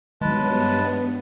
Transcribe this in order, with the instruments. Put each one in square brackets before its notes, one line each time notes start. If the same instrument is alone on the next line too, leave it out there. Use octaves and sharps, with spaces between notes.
[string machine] G2 B3 [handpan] D#3 F#3 [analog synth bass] G#3 [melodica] B4 A5